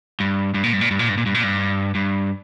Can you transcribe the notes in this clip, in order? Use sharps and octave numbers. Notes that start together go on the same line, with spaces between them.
G2
G2
A#2
G2
A#2
G2
A#2
G2
A#2
G2
A#2
G2
G2